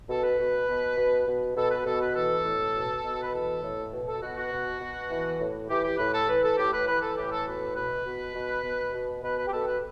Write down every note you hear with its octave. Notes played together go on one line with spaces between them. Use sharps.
B2 A4
B4
B2
B2
B2
B2
B2 A4
B4
B2 A4
B4
E3 A4
A2
B2
B2
B4
E3 A4
A2
B2
A4
B2 F#4
F#4
B2
B2
E3
A2
E3 G4
G4
A2 B4
A4
E3 B4
A4
A2 G4
B4
E3 B4
A4
A2 G4
A4
B2 B4
B2 B4
B2
B2
B2
B2
B2 B4
B4
G4
B2 A4
B4